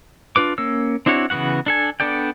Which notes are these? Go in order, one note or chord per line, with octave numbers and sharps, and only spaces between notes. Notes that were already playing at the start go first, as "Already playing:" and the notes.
D4 F4 B4 D6
A#3 C#4 E6
C4 D4 E4 F#4 C#5
C#3 E3 B3 F#4 F#5
D4 A4 G#5
B3 D4 A4 D5 G5